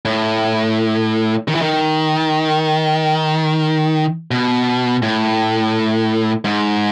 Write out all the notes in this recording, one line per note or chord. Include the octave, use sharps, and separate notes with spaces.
A2
D#3
E3
D#3
B2
A2
G#2